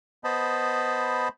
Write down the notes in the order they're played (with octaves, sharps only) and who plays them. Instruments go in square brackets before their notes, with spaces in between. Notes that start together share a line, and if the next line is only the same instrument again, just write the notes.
[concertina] B3 C5 D#5 A5 B5